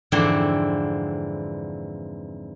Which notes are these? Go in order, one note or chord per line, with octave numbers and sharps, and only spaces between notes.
F2 G#2 D3 E3 C4 E4